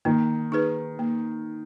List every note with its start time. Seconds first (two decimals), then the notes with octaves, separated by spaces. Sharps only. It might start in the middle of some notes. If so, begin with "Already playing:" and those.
0.05 D#3 A#3
0.52 D#4 G#4 B4
0.99 A#3